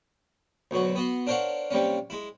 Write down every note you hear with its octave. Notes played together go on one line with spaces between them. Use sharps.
D2 B2 F#3 F#4
B3 F#4 C6
D4 A#4 C5 C#5 F5 F#5
C3 G3 A#3 C#4
G#3 E4